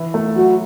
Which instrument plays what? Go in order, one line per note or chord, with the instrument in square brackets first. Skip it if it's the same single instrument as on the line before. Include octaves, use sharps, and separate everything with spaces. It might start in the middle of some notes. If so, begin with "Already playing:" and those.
Already playing: [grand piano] E3
A3
[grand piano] F#3 [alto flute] F#4